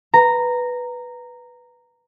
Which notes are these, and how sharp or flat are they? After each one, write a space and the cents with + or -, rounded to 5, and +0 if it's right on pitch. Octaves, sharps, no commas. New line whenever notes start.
B4 +0 A#5 -10